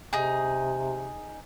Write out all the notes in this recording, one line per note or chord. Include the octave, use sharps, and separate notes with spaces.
C3 D#4 G#4